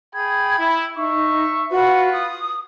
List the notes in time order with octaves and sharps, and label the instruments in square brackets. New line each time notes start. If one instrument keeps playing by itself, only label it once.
[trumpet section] G#4 G5 B5 [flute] G#6
[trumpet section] E4
[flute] D#4 [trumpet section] E5 C#6
[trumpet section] F4 B4 [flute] F#4
[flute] D#6